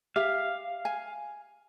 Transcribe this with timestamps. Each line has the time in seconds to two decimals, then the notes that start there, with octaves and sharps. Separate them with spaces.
0.16 G4 E5 F5
0.85 G#5